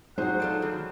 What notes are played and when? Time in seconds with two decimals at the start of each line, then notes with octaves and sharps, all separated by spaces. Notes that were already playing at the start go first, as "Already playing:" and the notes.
0.18 F#3 D#4 F#4 G#4 C5 F#5
0.40 F4 A4 D5
0.62 D#3 E3